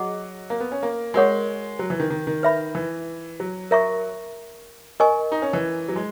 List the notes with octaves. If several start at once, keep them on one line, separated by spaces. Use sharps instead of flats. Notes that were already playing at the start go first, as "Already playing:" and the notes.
Already playing: F#3 G#4 D#5 F#5
A#3
B3
C#4
A#3
G#3 F#4 A#4 C#5 F#5 C#6
F#3
E3
D#3
D#3
D#3
B4 E5 B5
E3
F#3
A#4 E5 A#5 C#6
A#4 D#5 G#5 C#6
D#4
C#4
E3
F#3
G#3